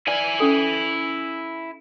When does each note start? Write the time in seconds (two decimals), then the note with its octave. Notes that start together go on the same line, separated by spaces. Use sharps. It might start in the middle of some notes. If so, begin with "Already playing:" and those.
0.07 E4 B4 D5 G#5
0.40 C#4 A4